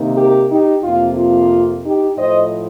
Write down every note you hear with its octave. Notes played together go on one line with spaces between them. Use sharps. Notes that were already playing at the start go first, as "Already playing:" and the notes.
Already playing: C3 D#3 A#3 D#4
G4 A#4
D#4 G4
F2 C3 F3 A#3 F4
F4
D#4 G4
A2 F3 A3 C5 D#5